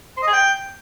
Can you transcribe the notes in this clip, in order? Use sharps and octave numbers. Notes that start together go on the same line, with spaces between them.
C5
D#5
G#4
G5